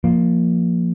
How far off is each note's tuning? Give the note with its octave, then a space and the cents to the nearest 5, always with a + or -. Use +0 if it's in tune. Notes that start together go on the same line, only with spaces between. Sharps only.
F3 +0 A#3 +0